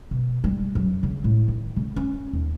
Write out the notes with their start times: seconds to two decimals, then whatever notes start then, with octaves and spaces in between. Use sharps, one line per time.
0.11 B2
0.44 G3
0.75 F#2
1.03 C#3
1.24 A2
1.48 D#3
1.76 C#3
1.96 C#4
2.33 D#2